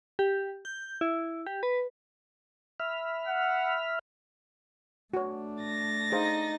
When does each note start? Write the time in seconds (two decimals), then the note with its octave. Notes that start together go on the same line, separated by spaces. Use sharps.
0.19 G4
0.65 G6
1.01 E4
1.47 G4
1.63 B4
2.80 E5 B5 F6
3.27 F#5
5.14 A3 D4 F#4 C#5
5.63 A6 A#6
6.12 D#4 G#4 C5 F5